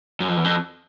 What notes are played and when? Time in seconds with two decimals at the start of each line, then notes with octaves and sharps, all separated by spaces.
0.20 F#2
0.28 F2
0.37 E2
0.44 F2